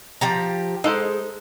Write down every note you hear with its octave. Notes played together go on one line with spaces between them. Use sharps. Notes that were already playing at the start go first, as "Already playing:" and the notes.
F3 G4 A#5
G#3 D#4 A4 C5